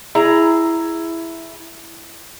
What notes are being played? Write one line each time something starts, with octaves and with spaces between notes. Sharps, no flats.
E4 G#4 A#5